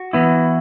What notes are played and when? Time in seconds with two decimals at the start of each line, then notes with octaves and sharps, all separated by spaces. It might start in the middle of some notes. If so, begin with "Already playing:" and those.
Already playing: F#4
0.13 E3 B3 E4